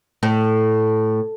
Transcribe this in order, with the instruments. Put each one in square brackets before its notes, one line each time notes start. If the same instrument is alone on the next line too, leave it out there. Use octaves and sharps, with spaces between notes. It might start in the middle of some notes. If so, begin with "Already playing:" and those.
[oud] A2